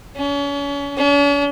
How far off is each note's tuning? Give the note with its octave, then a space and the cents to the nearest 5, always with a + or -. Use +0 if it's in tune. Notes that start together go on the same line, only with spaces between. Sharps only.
C#4 +35
C#4 +45